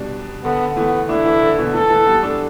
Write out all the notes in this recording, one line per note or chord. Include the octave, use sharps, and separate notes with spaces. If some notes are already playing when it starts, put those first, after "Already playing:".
Already playing: B2 G3 D4
D3 B3
E3 A3 B3
A3 D4 E4
E3 A3
D3
B2 E3
E3 A3 A4
E3 A3
G3 B3
A3 D4